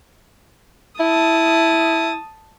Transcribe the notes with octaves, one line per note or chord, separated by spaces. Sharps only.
E4 A5 D#6